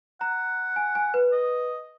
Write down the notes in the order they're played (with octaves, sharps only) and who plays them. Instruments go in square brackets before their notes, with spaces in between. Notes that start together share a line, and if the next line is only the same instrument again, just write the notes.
[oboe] F#5 [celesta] A#5
[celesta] G#5
G#5
B4
[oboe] D#5